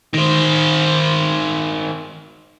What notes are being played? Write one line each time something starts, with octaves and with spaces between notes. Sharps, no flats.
D#3 C5